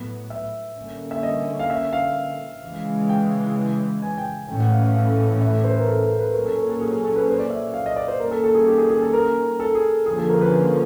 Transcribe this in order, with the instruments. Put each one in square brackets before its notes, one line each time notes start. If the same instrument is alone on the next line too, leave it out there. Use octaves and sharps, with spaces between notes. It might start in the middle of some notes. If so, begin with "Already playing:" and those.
Already playing: [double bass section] A2 F#3 B3
[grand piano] E5
[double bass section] D3 G3 A#3 C#4
[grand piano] E5
D#5
F5
E5
F5
[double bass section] C#3 E3 G#3
[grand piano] G5
G#5
G5
[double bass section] A2 E3 A3 C#4 [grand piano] G5
[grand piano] F#5
F5
F5
F5
E5
C5
B4
A#4
A4
A#4
B4
[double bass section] A#2 F#3 A#3 C#4 [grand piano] A#4
[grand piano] A4
A#4
A4
G#4
G#4
A4
B4
C5
D5
E5
F5
D#5
D5
C5
[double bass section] D#3 G3 A#3 C#4 [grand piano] A#4
[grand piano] A4
A4
G#4
G4
G#4
G#4
A4
A#4
A4
G#4
[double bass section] D3 F3 A#3 C#4 [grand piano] G#4
[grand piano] A4
A#4
B4
A4